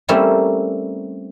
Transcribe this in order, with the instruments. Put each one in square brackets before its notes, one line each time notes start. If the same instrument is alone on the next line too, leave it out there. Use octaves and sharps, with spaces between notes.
[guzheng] G3 A3 A#3 C4 C#4 E4